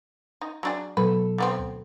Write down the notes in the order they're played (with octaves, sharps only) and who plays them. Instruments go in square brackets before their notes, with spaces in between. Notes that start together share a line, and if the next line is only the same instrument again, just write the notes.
[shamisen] D#4
F#3 D4 G#4
[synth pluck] B2 F#3 A4 [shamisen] B4
[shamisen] D3 B3 C4
[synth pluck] D2